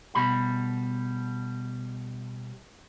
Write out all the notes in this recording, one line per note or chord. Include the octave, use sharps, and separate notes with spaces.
B2 G3 B5